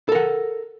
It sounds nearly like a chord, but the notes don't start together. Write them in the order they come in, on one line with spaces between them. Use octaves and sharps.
A4 A#4 F#5